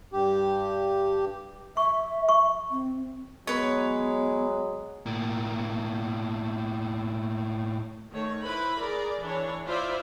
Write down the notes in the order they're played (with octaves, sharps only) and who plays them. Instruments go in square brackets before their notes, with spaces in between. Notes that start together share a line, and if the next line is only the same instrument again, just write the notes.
[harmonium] G2 G4
[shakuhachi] E5 [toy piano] C#6
[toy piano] C#6
[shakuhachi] C4
[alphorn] F#3 [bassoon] G#3 [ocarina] B3 [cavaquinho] B4 C#5
[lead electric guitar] A2 A#3
[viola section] D#3 A3 C#5
E4 B4 C5 B5
G#4 A#4 D5
E3 D4 C#5
E4 F4 C5 D5 E5 F5